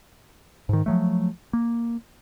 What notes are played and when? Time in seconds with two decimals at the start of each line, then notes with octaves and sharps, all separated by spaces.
0.69 G#2 D#3
0.86 F3 F#3 A3
1.53 A#3